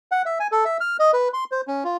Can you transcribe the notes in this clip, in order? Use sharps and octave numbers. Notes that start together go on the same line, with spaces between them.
F#5
E5
G#5
A4
E5
F6
D#5
B4
C6
C5
C#4
F4